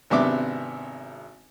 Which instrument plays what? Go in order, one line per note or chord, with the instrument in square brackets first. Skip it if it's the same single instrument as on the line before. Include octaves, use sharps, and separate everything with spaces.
[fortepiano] G#1 C3 B3 D4 E5 D6